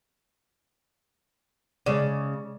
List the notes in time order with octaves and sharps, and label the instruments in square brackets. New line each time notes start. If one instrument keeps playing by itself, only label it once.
[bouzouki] C#3 [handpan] G#3 C#5 D5